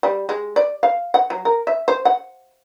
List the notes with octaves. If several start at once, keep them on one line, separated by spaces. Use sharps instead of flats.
G3
G#3
D5
F5
F#5
F#3
A#4
E5
C5
F#5